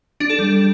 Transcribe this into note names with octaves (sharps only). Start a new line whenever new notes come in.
D4
A4
G3